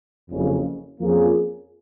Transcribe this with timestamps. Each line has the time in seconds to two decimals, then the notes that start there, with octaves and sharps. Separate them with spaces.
0.31 F#1 F2 C#3
1.00 F2 F3 A#3 C#4 G#4